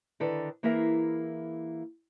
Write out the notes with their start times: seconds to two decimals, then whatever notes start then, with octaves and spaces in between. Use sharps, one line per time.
0.20 D3 D#3 E4 A4 B4 D5
0.63 E3 A#3 E4 G#4 A#4 E5